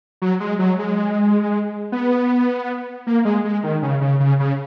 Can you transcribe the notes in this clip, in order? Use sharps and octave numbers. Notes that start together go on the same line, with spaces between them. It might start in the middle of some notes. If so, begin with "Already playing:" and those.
F#3
G#3
F#3
G#3
B3
A#3
G#3
G#3
D#3
C#3
C#3
C#3
C#3